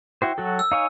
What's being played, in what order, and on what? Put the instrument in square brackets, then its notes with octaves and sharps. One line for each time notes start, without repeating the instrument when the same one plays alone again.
[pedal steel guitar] E4 F#4 C5 [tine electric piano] G5
[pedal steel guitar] F#3 F#4 A4
[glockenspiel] E6
[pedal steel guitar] D#4 C#5 G#5 [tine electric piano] F5